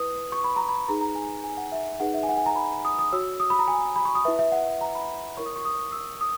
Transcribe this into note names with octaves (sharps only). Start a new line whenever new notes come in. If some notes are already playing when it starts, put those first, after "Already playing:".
Already playing: E4 B4 D#6
C#6
B5
A#5
B5
D#4 G#4 B4 A#5
A#5
G#5
G#5
F#5
E5
D#4 G#4 B4 F#5
E5
G#5
F#5
G#5
A#5
B5
D#6
D#6
F#4 C#5 E6
D#6
B5
A#5
G#5
B5
C#6
D#6
E4 B4 E5
E5
F#5
A#5
B5
E4 A#4 C#5 C#6
D#6
C#6
D#6
C#6
E6
D#6